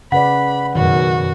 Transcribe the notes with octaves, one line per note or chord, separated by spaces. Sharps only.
C#3 B4 D5 F#5 B5
F#2 B2 D#3 F#4